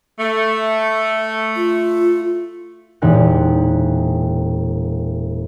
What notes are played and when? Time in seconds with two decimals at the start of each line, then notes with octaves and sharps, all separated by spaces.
0.19 A3
1.56 F4
3.02 E1 A#2 D#4 G4 A#4 F#6